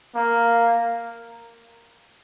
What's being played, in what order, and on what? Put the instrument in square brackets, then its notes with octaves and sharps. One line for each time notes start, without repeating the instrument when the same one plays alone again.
[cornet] A#3